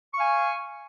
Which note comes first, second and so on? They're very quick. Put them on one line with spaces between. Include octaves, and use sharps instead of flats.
C#6 F5 G#5